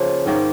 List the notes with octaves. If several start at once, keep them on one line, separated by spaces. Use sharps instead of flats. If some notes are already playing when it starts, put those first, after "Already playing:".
Already playing: C#3 F3 A#3 F4
G#2 D#3 A#3